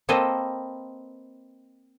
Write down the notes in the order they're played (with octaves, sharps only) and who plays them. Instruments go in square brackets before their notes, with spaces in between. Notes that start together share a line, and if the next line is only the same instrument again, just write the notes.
[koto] A#3 C4 A4 B4 C5 D#5